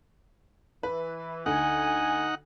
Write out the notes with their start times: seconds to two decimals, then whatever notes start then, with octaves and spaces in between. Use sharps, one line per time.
0.83 E3 B4
1.46 D2 D#4 F#5 G#5